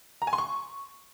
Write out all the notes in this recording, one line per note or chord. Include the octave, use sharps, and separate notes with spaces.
A#5
G#5
C6
C#6